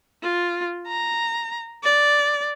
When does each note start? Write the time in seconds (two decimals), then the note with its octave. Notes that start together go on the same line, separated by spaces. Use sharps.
0.23 F4
0.88 A#5
1.84 D5